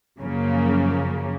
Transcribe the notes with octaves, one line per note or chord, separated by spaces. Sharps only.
F#2 C#3 F3 A#3